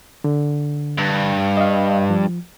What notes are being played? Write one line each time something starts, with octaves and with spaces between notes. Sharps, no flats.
D3
G2
D#5 F5
F3